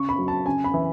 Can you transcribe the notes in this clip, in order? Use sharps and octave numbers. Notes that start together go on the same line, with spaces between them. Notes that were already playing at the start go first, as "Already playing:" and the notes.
Already playing: C#3 C#6
B5
F#3
A5
C#3 G#5
B5
E3